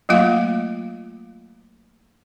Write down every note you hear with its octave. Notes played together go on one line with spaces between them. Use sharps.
F#3 A3 A#3 F4 F5